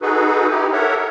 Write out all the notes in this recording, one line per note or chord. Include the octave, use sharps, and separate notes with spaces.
D#4 F#4 G#4 A4 B4
D#4 E4 G4
A4 A#4 C#5 E5 F#5